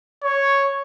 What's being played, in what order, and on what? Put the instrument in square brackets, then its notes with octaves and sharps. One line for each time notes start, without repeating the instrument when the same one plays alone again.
[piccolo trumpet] C#5